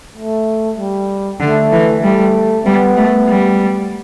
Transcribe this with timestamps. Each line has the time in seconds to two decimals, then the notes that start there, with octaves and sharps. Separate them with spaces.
0.16 A3
0.78 G3
1.40 D3 A3
1.72 E3
2.03 G3 A3
2.65 G3 B3
2.97 A3
3.28 G3